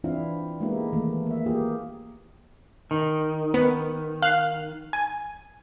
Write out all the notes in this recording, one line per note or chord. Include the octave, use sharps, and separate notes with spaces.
E3 C4 D4 E4 F4 F5
G#3 A#3 B3 D#4 E4 G4
D#3 E3 A3 A#3
A#3 E5
A#3 F4 G4 G#4
D#3
B3
F5 F#6
G#5